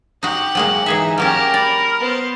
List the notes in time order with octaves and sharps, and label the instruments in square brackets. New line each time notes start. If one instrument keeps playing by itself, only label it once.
[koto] D#4 F#4 [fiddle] G4 F#5
[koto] F#3 G#3 A#3
[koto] E3 G#4 E5 [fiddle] D#4
[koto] F#3 A#3 C#4 [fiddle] G4 A5 [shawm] A#4
[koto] D5 [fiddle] B5
[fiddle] B3 C5